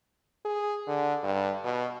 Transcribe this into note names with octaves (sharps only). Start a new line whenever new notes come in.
G#4
D3
G2
B2